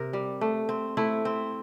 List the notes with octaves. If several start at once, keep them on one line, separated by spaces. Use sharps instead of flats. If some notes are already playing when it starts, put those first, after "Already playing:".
Already playing: C3 A#4
G3
A3
C4
A3 E4
C4